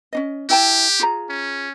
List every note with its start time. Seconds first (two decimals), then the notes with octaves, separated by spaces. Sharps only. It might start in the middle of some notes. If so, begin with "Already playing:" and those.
0.13 C#4 D4 D#5
0.50 E4 G4 G5 A5
1.00 F4 G#4 A#5
1.29 C#4